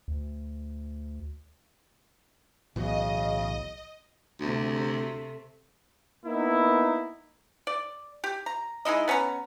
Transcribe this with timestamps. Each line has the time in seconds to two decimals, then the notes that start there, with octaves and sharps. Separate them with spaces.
0.08 D2
2.76 B1 A2 C#3 E3 F#3 D#5
4.40 D2 C3 A3
6.26 A#3 B3 D#4 E4
7.67 D5
8.24 G4
8.46 A#5
8.85 G#3 D#4 E4 D#5
9.08 B3 C#4 D5 A#5